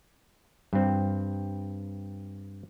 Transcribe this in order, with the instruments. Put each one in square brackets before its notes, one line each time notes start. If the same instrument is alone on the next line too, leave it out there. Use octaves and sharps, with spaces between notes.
[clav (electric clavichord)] G2 C4